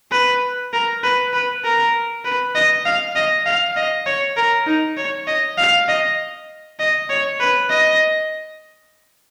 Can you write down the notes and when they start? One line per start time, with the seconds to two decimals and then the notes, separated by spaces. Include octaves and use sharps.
0.12 B4
0.73 A#4
1.03 B4
1.33 B4
1.65 A#4
2.25 B4
2.55 D#5
2.85 F5
3.16 D#5
3.46 F5
3.76 D#5
4.06 C#5
4.37 A#4
4.67 D#4
4.97 C#5
5.28 D#5
5.58 F5
5.88 D#5
6.80 D#5
7.09 C#5
7.40 B4
7.70 D#5